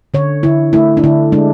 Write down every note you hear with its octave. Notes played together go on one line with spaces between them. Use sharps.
D3 C#5
D3 E4
A3 E4
D4
D3 E4
G#3 D4